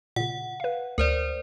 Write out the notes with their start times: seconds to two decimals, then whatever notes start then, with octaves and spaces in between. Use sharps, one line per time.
0.16 A#2 C#3 F#5
0.60 B4 F5
0.98 D2 A#4 C5 D5